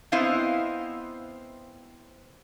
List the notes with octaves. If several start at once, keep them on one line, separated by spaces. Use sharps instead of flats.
B3 C4 E4 C5 D#5 F5